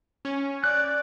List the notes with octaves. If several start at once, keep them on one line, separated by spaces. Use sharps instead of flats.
C#4
D5 F#6